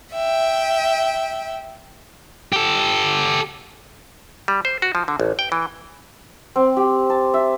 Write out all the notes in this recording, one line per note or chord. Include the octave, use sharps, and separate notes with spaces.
E5 G5
G4 A4
G3
C5
F#4
F3
D3
A1
G5
E3
C4
G4
A5
E5